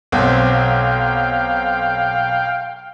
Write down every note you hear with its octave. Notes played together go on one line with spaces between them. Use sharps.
B1 C4 F5 G5